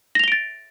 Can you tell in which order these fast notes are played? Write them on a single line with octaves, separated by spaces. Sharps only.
A#6 F7 G7 D7 A6